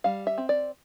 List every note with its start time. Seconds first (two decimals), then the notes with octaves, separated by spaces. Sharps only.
0.04 G3 F5
0.27 E5
0.38 C4
0.49 D5